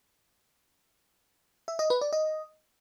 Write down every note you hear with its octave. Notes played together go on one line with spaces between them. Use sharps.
E5
D#5
B4
D5
D#5